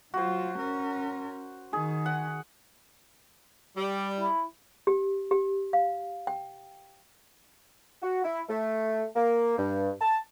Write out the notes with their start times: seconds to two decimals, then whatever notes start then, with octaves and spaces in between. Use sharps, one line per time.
0.14 F#3 F4 F#4 C5
0.58 C#4 A#4
1.73 D#3 G#4
2.06 F#5
3.77 G3
4.20 E4
4.87 G4
5.31 G4
5.73 F5
6.27 G5
8.03 F#4
8.24 E4
8.49 A3
9.16 A#3
9.58 G2
10.01 A5